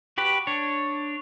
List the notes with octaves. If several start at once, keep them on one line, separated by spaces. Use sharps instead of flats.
F#4 G4 B4
D4 C#5